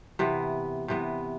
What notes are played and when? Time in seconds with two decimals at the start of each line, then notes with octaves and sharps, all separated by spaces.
0.19 C3 E3 B3
0.88 C3 E3 B3